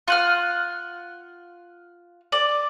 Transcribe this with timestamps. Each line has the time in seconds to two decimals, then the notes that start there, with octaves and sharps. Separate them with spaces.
0.08 F4 F#5 F6
2.32 D5